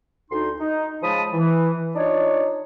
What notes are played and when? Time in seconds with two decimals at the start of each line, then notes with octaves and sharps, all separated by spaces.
0.31 D2 D#4 C6
0.59 D#4
1.02 C#3 F3 G#3 A5 B5 D#6
1.32 E3
1.95 D4 D#4 F4 C#5